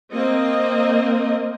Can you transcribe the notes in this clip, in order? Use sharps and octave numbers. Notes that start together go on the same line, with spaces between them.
A#3 C4 D#5